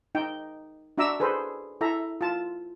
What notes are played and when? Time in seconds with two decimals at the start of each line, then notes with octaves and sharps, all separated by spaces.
0.15 D#4 G5
0.98 D4 F#4 E5 A#5 D6 E6
1.20 G#4 A4 B4 C5
1.81 E4 A4 E5 A#5
2.21 F4 A5